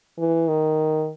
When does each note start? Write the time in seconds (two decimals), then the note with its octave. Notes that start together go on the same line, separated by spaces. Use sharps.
0.18 E3
0.48 D#3